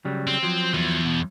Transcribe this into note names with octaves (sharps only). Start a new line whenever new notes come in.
C#3 F#3 G3
C4
F3 F#3
E2
B2